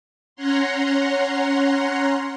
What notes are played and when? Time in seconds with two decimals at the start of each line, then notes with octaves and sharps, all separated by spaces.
0.36 C#4 C#5 F#5 A#5 C6